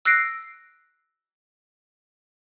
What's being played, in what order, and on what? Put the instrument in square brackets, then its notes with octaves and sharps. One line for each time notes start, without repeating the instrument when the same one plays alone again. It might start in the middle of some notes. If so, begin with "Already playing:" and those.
[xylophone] E6 F#6 A#6 C7 D7